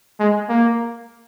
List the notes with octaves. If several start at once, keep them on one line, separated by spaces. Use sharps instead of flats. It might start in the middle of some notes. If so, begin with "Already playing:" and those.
G#3
A#3